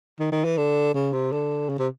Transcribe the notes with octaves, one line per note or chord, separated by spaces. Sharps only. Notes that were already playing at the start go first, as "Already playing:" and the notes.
D#3
D#3
E3
D3
C#3
C3
D3
C#3
C3